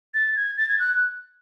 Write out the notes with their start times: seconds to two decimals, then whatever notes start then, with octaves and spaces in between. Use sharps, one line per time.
0.14 A6
0.36 G#6
0.58 A6
0.69 G#6
0.79 F#6